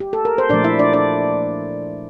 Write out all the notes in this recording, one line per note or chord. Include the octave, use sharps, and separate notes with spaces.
G4
A4
A#4
C5
A#2 F3 A3 D4 D5
E4 E5
D4 D5
D4 D5